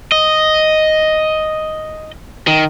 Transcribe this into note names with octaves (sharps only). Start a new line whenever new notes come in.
D#5
D#3